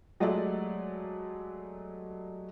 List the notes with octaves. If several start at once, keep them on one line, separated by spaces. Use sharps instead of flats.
F#3 G#3 A3 G4 D5 E5